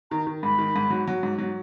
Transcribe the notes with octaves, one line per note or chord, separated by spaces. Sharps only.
D#3 A#5
D#3
G#2 B5
D#3
G#2
F#3
F#3
G#2
F#3